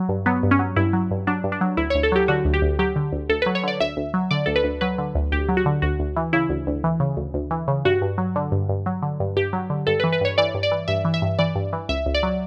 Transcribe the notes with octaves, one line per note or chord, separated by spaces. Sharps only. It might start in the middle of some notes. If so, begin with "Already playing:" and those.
Already playing: F#3
G2
F#3 B3
G2
C#4
F#3
G2 E4
F#3
G2
F#3 D4
G2
D4
F#3
D2 E4
D2 C#5
A4
F#3 G4
D3 F#4
D2
G4
D2
F#3 G4
D3
D2
D2 A4
F#3 B4
C#5
D3 D5
D2 E5
D2
F#3
D3 D5
D2 A4
B4
D2
F#3 B4
D3
D2
D2 G4
F#3
F#4
D3
D2 F#4
D2
E3
C#3 E4
D2
D2
E3
C#3
D2
D2
E3
C#3
G2 F#4
G2
F#3
D3
G2
G2
F#3
D3
G2
G2 G4
F#3
D3
G2 A4
B4
E3
B4
G2 C#5
E3 D5
G2
D5
E3
G2 E5
E3
E5
G2
E3 D5
G2
E3
C#2 E5
C#2
D5
F#3